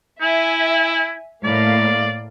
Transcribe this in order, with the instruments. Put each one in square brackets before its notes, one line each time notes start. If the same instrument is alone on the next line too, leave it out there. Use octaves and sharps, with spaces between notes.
[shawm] E4 [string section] E5 G#5
[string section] A2 A#3 F5 [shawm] D5